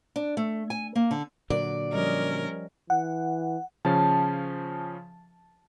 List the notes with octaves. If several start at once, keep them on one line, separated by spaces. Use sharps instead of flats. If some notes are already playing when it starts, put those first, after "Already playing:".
D4
A3
G#5
A#3
D3
A#2 D3 F#3 D5
F3 G3 C#4 A#4 D#5
E3 F#5
C#3 F3 C#4 A5